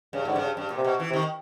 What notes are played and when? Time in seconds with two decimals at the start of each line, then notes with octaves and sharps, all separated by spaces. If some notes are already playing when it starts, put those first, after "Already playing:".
0.13 G2 C#3
0.25 G#2 D3
0.36 G2
0.42 C#3
0.57 G2
0.70 A#2
0.78 C3
0.84 B2
1.00 E3
1.10 C3
1.13 D#3